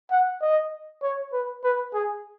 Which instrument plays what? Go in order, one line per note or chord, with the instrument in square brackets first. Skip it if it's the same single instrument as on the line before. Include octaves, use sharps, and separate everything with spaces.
[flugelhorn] F#5
D#5
C#5
B4
B4
G#4